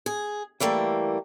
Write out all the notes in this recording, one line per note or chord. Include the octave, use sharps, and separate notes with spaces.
G#4
E3 G3 A3 A#3